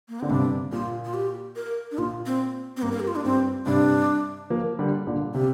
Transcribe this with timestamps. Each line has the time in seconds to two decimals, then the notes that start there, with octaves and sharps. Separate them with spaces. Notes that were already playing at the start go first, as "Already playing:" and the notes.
0.09 A#3
0.20 D3 C4
0.30 G2 C3 D4
0.72 A#2 F4
1.05 F4
1.14 G4
1.56 A#4
1.92 D4
1.98 A#2 F4
2.26 C4
2.77 C4
2.82 G2 A#3
2.92 A#4
3.00 G4
3.07 F4
3.16 D4
3.24 G2 C4
3.66 G2 C3 D4
4.50 F3 A#3
4.79 D3 G3
5.07 A#2 D3
5.34 C3 G4